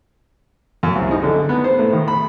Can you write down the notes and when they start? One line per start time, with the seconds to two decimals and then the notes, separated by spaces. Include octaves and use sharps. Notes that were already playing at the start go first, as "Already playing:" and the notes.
0.83 F#2
0.95 C2
1.11 D#4
1.23 D3
1.49 B3
1.64 C5
1.79 A2
1.93 D#3
2.08 B5